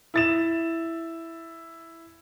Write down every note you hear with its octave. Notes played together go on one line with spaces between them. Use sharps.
E4 A6 E7